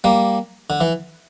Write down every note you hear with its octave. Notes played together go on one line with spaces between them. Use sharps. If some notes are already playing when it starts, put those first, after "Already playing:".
G3 A#3
D3
E3